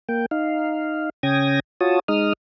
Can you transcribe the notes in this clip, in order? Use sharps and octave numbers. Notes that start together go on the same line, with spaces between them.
A#3 G5
D#4 F5
C#3 C#4 G5 D#6 G#6 A#6
F4 F#4 C#5 A5 D#6
G#3 D#4 D#6 F6